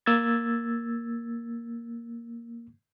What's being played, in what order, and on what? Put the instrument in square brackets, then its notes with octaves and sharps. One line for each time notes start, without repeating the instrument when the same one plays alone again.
[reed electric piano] A#3 E6 G#6 A6